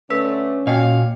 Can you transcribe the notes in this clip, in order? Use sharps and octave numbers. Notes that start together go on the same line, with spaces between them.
D3 A3 C#4 B4 E6 B6
A#2 F#4 D#5 F5 G5 G#5